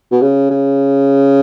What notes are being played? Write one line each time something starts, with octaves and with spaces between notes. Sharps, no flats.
B2
C#3
C#3